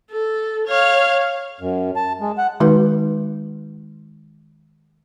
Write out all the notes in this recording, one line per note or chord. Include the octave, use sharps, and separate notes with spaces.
A4
C#5 F5
F#2
A5
G#3
F#5
D#3 G#3 D#4 F#4 B4